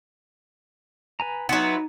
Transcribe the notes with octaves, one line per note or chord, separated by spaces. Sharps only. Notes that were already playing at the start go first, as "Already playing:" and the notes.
B4 G#5 A#5
F#3 B3 D#4 E5 F#5 C6